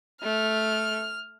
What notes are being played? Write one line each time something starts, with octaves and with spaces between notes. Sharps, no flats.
A3 F6